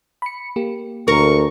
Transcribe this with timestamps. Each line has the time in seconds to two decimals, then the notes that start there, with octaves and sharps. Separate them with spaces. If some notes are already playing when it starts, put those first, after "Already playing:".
0.22 B5 C#7
0.56 A#3 G4
1.08 D2 A#4 C#6